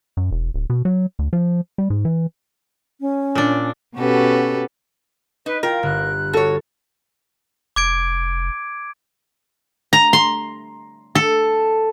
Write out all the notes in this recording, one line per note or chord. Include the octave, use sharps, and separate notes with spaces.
F#2
E1
D1
B2
F#3
D2
F3
G3
G#2
E3
C#4
A#2 D4
B2 C#4 F#4 G4 A4 B4
D#4 B4
F4 A#4 G5
G1 F#6
F#4 A4 C#5
F1 D6 G#6 D7
A#5
C6
A4